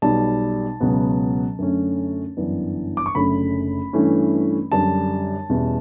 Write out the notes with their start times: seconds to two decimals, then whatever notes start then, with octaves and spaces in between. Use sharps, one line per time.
0.02 B1 B2 G3 A5
0.80 C#2 B2 F#3 B3
1.58 F#2 D3 A3 C#4
2.37 G1 F#2 E3 B3 D4
2.97 D6
3.06 C#6
3.15 F#1 F#2 D3 A3 C#4 B5
3.93 G2 E3 A3 C#4
4.71 F#2 D3 G3 D4 A5
5.50 E2 B2 G3 C#4